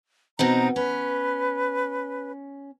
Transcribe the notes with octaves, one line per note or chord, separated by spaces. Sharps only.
B2 C4 D#4 A#5
C#4 B4